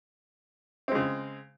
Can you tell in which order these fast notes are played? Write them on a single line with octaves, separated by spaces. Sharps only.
C4 G#3 C#3